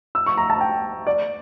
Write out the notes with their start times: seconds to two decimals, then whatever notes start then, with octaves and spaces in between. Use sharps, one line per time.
0.15 E6
0.26 C#6
0.37 A#5
0.50 A5
0.61 G5
1.07 D5